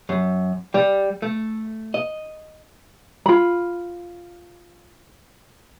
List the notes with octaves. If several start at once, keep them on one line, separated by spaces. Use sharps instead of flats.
F#2
G3
A3
D#5
F4 B5